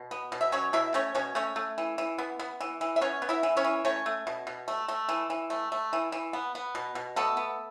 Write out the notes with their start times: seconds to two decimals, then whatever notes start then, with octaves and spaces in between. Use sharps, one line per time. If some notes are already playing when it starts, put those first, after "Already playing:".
Already playing: B2
0.11 B3
0.32 B2
0.41 E5
0.52 F#3 C#4 C#5
0.73 B2 E4 E5
0.94 A3 C#4 C#5
1.15 B2 C#4 C#5
1.35 A3 C#4 C#5
1.56 A3
1.78 E3
1.98 E3
2.18 B3
2.39 B3
2.60 E3
2.81 E3
2.96 E5
3.01 B3 C#4 C#5
3.22 B3
3.29 E4 E5
3.43 E3
3.57 C#4 C#5
3.64 E3
3.85 A3 C#4 C#5
4.06 A3
4.27 B2
4.47 B2
4.68 A3
4.88 A3
5.09 E3
5.30 E3
5.50 A3
5.72 A3
5.93 E3
6.12 E3
6.33 B3
6.55 B3
6.75 B2
6.95 B2
7.16 A3 B3 A4
7.37 B3